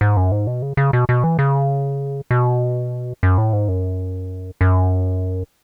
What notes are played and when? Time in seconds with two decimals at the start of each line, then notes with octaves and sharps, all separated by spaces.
0.01 G#2
0.17 F#2
0.32 G#2
0.47 B2
0.62 C#3
0.77 C#3
0.93 B2
1.09 B2
1.24 E3
1.39 C#3
2.31 B2
3.23 F#2
3.38 A2
3.53 G#2
3.68 F#2
4.61 F#2